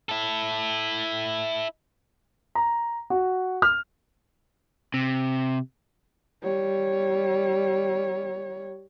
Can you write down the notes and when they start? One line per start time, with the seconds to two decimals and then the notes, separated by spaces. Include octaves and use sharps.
0.09 E4 A4
2.55 A#5
3.10 F#4
3.62 F6
4.94 C3
6.43 G3 C#5